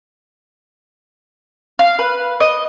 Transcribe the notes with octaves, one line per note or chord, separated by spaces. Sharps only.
F5
B4
D#5